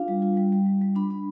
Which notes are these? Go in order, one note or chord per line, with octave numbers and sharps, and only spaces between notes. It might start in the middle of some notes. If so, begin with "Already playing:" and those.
Already playing: D4 F4 F5
G3
F4
G3
G3
G3
G3
D4 B5
D4